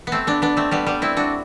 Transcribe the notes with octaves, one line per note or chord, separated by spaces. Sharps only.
A3 B3 C4
B3 D4
B3 D4
A3 C4
G3 B3
G3 B3
C4 E4
D4 F#4